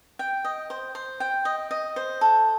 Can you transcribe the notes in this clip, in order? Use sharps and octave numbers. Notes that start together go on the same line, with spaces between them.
G5
D#5
C5
C5
G5
D#5
D#5
C5
A4